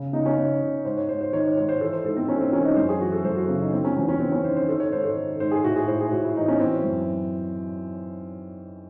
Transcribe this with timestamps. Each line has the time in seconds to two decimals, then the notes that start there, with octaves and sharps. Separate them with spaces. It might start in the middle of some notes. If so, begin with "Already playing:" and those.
Already playing: C#3
0.13 C#3 D#4
0.26 C#4
0.37 C#3
0.62 C#3
0.85 G#2 C5
0.97 C#5
1.09 G#2 C5
1.21 C5
1.33 D#3 C#5
1.45 C5
1.57 G#2 C#5
1.69 C5
1.81 E3 A4
1.93 C5
2.05 G#2 A4
2.17 C4
2.28 G#2 C#4
2.41 C4
2.52 E3 C#4
2.65 D#4
2.76 F#2 C5
2.89 G#4
3.01 E3 F#4
3.12 A4
3.24 F#2 C5
3.36 F#4
3.48 C#3
3.61 D#4
3.73 D#3 C4
3.85 C#4
3.96 E2 C#4
4.08 C#4
4.20 E2 C4
4.32 C#4
4.45 D#3 C5
4.56 C5
4.68 D#3 A4
4.80 C#5
4.92 G#2 C5
5.04 A4
5.16 D#3
5.40 G#2 C5
5.51 G#4
5.64 A2 F#4
5.76 G#4
5.88 A2 C5
6.00 G#4
6.12 A2 F#4
6.24 E4
6.36 E3 D#4
6.48 C#4
6.60 E3 C4
6.84 F#2